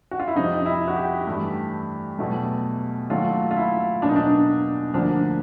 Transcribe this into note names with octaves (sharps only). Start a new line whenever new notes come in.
F#4
F4
E4
F2 C3 F3 D#4
E4
F#4
G4
G2 E3 A3
E2 B2 F#3 A3
D#2 D#3 F#3 A3 F4
F4
E4
E2 B2 F#3 A#3 D4
D#4
D4
D2 D3 F3 A#3 D4